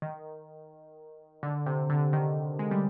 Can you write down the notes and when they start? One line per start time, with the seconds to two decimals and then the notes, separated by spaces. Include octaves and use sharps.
0.02 D#3
1.43 D3
1.66 C3
1.89 D3
2.13 D#3
2.59 G#3
2.71 G3